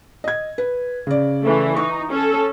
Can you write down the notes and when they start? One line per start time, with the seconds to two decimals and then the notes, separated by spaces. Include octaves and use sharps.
0.24 D#5 G#6
0.58 B4
1.07 C#3 D5
1.43 E3 A3
1.76 D#4 C#6
2.10 C#4 A4